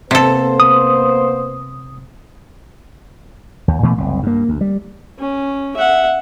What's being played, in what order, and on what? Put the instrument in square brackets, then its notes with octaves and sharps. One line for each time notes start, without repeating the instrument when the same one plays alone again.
[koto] C3 A4 [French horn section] A#3 B3 C5
[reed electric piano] D#6
[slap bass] D#2
A#2 E3 A3 B3
F#1 C2
G2 A#3
D2
G3
[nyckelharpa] C#4
E5 F#5